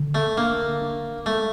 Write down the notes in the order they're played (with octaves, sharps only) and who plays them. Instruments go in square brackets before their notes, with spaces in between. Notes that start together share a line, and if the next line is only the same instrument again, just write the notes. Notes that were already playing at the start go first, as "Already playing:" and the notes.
Already playing: [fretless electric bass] D3
[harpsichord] A3
[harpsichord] A#3 [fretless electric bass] D4
[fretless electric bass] D4
[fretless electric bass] G#3 [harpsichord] A3